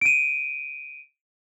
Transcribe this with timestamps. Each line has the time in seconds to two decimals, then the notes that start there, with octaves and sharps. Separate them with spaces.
0.01 D7 D#7